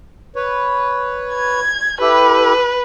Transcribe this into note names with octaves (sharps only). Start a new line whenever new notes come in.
B4 C#5
G#6
E4 G4 A4 B4